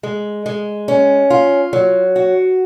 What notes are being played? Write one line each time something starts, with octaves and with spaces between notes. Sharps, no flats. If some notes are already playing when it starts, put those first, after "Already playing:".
G#3
G#3
C#4
F4
F#3
F#4